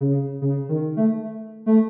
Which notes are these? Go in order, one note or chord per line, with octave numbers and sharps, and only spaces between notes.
C#3
C#3
D#3
A3
A3